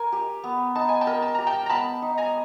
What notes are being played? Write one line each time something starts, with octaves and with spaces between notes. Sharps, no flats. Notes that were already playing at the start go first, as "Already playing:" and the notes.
Already playing: A#4 G#5
G4
B3
D#4 A5
G#5
G5 A5
A#4
A5
G4 A#5
G5 A5
A#5
B3 A5 B5
D#4
G#5 A#5